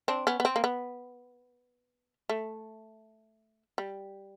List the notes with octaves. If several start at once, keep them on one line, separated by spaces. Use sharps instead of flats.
C4 D4
B3 C#4
B3
C4
A#3
B3
A3
G3